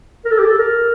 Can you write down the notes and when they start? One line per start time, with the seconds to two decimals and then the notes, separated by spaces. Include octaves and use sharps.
0.25 A#4
0.31 A4
0.38 G4
0.45 A4
0.58 A#4